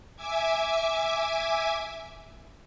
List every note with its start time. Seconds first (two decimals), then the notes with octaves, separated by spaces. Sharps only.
0.16 E5 G#5 D6 G#6